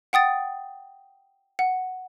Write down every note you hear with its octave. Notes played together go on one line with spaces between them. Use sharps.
F#5 G5 D#6 A6
F#5